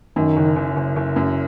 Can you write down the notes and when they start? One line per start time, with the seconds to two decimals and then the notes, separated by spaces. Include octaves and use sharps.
0.16 F#2 D#3
0.37 F#1
0.56 F#1
0.76 F#1
0.96 F#1
1.16 F#2